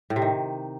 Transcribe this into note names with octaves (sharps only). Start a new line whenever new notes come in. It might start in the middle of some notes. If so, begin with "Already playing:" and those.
A2
C3
D#3